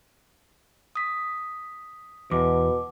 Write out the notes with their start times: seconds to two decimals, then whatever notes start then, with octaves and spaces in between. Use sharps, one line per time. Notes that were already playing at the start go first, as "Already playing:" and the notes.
0.95 D#6 B6
2.31 E2 B2 D6